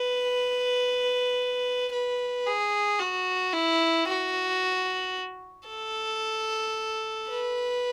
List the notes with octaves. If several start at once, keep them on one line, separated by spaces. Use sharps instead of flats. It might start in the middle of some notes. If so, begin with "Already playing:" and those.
Already playing: B4
B4
G#4
F#4
E4
F#4
A4
B4